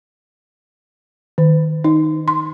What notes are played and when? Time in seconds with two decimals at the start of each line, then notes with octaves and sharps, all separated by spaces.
1.38 D#3
1.84 D#4
2.28 C6